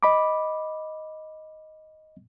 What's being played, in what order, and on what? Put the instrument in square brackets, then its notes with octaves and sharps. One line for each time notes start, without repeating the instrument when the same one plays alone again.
[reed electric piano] D#5 B5 D6